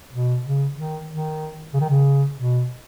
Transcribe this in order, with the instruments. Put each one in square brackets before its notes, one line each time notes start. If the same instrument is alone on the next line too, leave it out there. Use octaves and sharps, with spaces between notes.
[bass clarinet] B2
C#3
D#3
D#3
C#3
D#3
C#3
B2